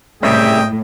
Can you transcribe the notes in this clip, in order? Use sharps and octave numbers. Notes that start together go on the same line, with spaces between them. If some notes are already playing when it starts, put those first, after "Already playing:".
C2 A2 C#3 G4 G#4 D#5 E5 G5